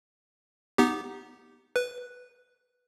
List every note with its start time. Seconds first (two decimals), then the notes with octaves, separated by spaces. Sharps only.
0.78 B3 D#4 G4
1.76 B4